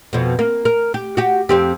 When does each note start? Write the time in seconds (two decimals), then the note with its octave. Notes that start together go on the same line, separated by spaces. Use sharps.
0.13 F2 B2
0.39 A#3
0.65 A#4
0.94 G4
1.17 F#4 G4
1.49 F2 C4 G4